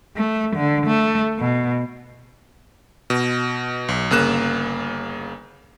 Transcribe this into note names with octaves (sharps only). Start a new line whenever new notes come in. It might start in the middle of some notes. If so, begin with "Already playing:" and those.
A3
D3
A3
B2
B2
B1
G1 C#3 A#3 F#6 E7